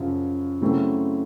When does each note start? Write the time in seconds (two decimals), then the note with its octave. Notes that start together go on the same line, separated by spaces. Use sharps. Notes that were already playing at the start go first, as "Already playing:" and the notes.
Already playing: F#2 C#3 F3
0.62 C#3 F#3 A3 C4 E4